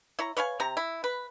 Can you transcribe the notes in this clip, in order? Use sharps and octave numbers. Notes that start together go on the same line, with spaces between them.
E4 C#5 A#5
B4 C#5 F5 G#5
C3 G4 A#5
E4
B4